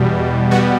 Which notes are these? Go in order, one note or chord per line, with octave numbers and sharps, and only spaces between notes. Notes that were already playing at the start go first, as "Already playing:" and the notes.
Already playing: E2 B2 G3
B2 G3 B3 F#4